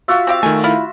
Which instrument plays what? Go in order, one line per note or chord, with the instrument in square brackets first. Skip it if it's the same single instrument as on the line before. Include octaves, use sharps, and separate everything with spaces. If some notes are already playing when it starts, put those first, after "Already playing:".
[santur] F4 F#4 E5
[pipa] C4 G4 F5
[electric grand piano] D#3 A3 [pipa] G#5
[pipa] E4 F4